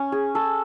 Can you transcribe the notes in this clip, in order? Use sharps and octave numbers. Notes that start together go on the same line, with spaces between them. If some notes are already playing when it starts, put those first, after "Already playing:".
Already playing: C#4
G#4
A4